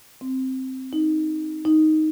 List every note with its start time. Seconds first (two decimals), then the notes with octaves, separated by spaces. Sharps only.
0.21 C4
0.93 D#4
1.65 D#4